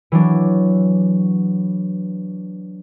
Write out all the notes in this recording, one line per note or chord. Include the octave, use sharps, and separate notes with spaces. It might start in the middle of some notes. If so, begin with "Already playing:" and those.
E3 F#3 D4